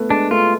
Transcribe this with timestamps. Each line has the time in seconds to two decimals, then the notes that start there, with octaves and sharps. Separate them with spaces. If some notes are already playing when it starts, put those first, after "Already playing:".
Already playing: A3 B3
0.10 G#3 D4
0.31 A3 F4